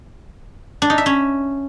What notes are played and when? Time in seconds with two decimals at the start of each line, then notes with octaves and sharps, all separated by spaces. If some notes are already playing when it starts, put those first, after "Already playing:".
0.82 D4
0.90 D#4
0.98 E5
1.06 C#4